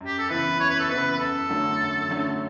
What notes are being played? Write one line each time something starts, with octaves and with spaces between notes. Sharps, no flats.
F#2
G4
A4
C#3 E3 B3 E4 B4
F#2 C#5
B4
A4
C#3 E3 B3 E4 B4
B4
F#2 A4
D3 F#3 A3 C#4
F#2
D3 F#3 A3 C#4